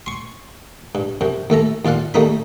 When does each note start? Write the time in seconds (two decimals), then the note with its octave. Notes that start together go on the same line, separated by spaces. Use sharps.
0.06 C6 C#6
0.95 G2
1.21 F#2 C3
1.50 D#2 A3 A4 A#5
1.85 D#2 F4 D5 F5 F#5
2.14 D#2 G3 A3 A#3 D#4 B5